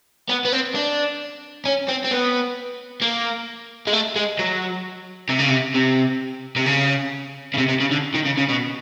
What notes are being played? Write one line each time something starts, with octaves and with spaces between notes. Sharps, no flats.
B3
B3
C4
D4
C#4
C4
C4
B3
A#3
G#3
A3
G#3
F#3
C3
C#3
C3
C3
C3
C#3
C#3
C3
C3
C#3
D3
D#3
C#3
C#3
B2